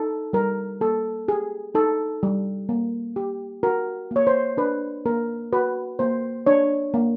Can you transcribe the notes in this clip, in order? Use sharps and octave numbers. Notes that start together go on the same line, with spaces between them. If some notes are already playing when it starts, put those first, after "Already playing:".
Already playing: D#4 A4
G3 A#4
A#3 A4
G4 G#4
D#4 A4
G3
A#3
G4
F#4 A#4
A#3 C#5
C5
D4 B4
A#3 A#4
F#4 B4
A#3 C5
D4 C#5
A#3